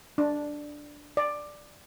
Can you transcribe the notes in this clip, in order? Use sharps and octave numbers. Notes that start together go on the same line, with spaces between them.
D4
D5